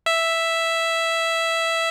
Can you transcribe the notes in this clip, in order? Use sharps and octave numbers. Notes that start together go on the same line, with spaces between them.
E5